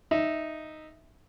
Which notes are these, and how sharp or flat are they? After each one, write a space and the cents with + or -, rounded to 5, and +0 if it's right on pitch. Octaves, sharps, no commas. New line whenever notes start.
D#4 +0 E5 +0